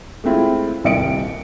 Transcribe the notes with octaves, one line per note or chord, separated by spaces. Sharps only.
G#3 A3 C4 E4 F4
D#1 C2 C4 D#5 C#7 D7